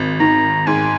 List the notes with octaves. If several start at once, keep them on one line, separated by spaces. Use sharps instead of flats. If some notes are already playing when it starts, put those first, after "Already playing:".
Already playing: G#1
D#3 A#5
G#2 G#5